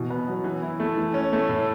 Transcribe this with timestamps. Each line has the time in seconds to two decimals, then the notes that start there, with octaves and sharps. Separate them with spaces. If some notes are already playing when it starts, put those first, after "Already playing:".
Already playing: B2 E3
0.10 B3
0.28 F#3
0.44 E3
0.62 E4
0.80 A3
0.97 E3
1.14 C#4
1.33 A3
1.49 A2